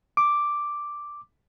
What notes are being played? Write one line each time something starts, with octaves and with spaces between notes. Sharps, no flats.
D6